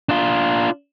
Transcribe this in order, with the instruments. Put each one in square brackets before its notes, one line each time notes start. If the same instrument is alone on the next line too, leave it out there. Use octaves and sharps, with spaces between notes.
[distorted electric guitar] D4 F4